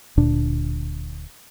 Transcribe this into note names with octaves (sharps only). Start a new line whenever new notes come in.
D1 D2 A#2 D4